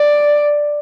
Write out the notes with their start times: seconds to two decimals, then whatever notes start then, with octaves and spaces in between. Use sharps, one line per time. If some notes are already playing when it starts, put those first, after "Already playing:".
Already playing: D5